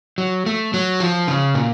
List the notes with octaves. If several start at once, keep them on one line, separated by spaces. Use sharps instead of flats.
F#3
A3
F#3
F3
C#3
A#2